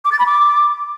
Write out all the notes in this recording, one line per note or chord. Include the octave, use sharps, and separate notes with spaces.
D6
A6
B5
D6